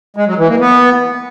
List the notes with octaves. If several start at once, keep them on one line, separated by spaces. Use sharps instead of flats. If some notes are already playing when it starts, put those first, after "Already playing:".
G#3
F#3
E3
A#3
B3